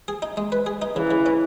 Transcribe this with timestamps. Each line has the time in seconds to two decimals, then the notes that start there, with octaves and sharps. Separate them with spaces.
0.08 G#4
0.22 D#4
0.37 G#3
0.52 B4
0.66 G#4
0.82 D#4
0.96 C#3 E3
1.11 C#3
1.26 C#4